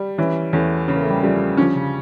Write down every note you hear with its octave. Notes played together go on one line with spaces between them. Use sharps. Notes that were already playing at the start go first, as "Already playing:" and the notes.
Already playing: G3
E3 C#4 E4
E2 A3 C#4
C#3 C#4
A#3
A3
G3 A#3
F3 G3 A3
D3 F3 C#4
C#3